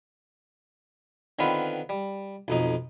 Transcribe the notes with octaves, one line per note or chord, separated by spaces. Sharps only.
D3 D#3 B3 C4 F4 B4
G3
B1 F2 D#4